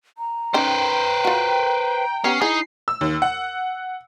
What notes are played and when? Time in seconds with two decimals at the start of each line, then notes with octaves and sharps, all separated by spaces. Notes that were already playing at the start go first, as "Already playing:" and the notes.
0.18 A#5
0.54 C#4 D#4 B4 C5 G5
1.25 F4 F#4
2.24 B3 C#4 G4 C7
2.42 D#4 E4 G#4
2.88 E6
3.01 D#2
3.22 F#5